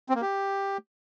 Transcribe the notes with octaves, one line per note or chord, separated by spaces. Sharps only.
C4
A#3
G4